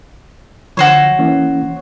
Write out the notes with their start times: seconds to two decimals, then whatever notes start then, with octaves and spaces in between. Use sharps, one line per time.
0.77 D3 F3 F#4 C5 C#5
1.19 E3 A#3 C#4